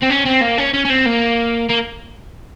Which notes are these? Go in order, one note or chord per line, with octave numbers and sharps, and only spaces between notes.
C4
C#4
C4
A#3
C#4
C#4
C#4
C4
A#3
A#3